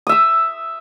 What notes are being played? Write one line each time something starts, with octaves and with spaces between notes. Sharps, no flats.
E5 D#6 E6